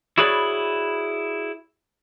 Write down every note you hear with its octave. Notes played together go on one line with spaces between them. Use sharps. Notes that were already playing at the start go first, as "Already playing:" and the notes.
E4 F#4 G#4 B4 C#5 D5